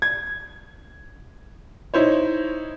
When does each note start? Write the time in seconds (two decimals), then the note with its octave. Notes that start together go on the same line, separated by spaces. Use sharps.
0.02 G#6
1.94 D#4 E4 C5 C#5